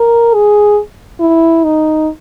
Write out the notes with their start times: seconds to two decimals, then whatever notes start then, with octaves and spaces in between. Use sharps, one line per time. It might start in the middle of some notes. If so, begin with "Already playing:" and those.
Already playing: A#4
0.35 G#4
1.20 E4
1.64 D#4